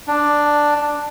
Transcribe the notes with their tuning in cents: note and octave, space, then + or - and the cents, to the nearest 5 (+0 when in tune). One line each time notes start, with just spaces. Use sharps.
D4 +5